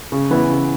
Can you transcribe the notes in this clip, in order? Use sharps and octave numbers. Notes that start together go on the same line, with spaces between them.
C#3
E3 B3 E4
C#3